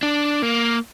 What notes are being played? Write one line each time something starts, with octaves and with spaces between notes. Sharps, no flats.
D4
A#3